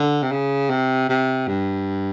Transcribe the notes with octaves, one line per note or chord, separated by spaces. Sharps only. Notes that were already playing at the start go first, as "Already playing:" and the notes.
Already playing: D3
C3
C#3
C3
C3
G2